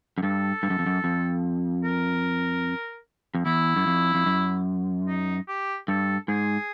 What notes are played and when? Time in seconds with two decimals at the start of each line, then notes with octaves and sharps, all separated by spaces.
0.18 F#2
0.22 G2 A4
0.63 G2
0.70 F#2
0.79 F2
0.86 F#2
1.04 F2
1.84 A#4
3.35 F2
3.46 E2 E4
3.76 F#2
3.87 F2
4.15 F2
4.26 F#2
5.07 D#4
5.48 G4
5.88 G2 A4
6.28 G#2 G#4